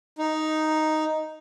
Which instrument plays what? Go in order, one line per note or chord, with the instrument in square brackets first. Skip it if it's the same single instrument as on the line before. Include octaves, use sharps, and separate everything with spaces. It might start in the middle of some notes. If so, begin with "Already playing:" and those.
[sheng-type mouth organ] D#4